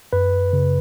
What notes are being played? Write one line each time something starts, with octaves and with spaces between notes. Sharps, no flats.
F#2 B4
C#3